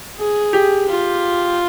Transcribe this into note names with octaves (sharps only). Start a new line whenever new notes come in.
G#4
G4
F4